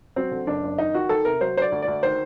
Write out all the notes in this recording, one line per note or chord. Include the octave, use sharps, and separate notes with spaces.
F#3 C4
D3
F#1 D4
F#1
D#3 D#4
D#3 F#4
D#3 A4
C3 A#4
F#3 C5
D3 C5
D5
D2
D2 D5
D#3 C5